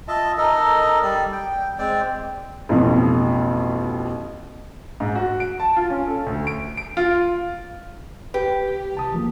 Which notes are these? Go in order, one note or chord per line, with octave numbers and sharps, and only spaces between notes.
F4 D#5 E5 A5
D#4 A4 A#4 D#5
G3 D5
G5
G#3 C4 D5 G5
A1 F2 B2
G#2
F#4
D7
A5
F4
C#4
A4
D2
D7
D7
F4
G4 B4
C2 A5 D#6
E2 F3 A#3